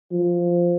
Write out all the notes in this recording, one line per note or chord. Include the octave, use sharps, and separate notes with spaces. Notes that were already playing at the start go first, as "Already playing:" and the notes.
F3